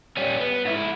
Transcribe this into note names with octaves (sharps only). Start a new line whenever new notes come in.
G3 C#4
B3
G#2 E4